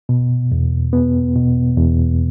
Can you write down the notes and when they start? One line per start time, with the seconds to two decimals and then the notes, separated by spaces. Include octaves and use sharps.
0.09 B2
0.52 E2
0.93 B3
1.35 B2
1.77 E2